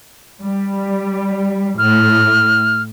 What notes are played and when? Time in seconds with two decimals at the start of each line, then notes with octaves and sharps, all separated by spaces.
0.41 G3
1.78 A2 F6